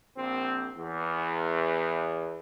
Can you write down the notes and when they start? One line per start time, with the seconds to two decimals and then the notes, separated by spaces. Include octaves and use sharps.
0.18 A#1 C4
0.76 E2